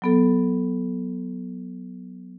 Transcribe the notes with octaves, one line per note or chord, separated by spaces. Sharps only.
F#3 B3 A4